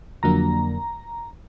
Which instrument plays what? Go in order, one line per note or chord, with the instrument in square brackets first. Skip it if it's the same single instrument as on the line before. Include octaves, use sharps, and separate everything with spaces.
[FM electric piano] F2 D3 F#3 A#3 D4 A#5